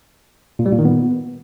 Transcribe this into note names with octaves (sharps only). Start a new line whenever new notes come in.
A#2
G3
A#2
D#3
B3